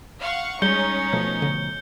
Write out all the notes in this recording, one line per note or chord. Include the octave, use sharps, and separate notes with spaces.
F5 F#5 C#6
G3 G#3 C#4 D#4 G6 C#7 G7
B2 F3 A3 G6
D3